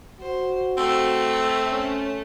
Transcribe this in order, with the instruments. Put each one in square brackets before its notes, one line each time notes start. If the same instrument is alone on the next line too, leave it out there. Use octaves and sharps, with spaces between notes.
[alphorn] F#4 [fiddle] C5
[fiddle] A3 [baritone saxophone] C4 [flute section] E6
[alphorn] C#4